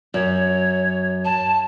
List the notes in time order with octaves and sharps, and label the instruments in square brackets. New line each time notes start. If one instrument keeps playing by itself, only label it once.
[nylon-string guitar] F#2 [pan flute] C#5
[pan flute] A5